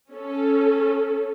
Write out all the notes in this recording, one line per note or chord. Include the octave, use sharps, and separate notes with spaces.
C#4 A4